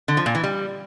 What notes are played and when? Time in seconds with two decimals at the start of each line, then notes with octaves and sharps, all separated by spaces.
0.08 D3
0.17 F3
0.26 A#2
0.35 E3
0.44 G3